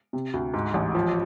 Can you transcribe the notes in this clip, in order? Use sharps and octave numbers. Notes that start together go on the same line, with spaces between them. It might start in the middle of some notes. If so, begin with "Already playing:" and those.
C3
D2
G#2
A1
F3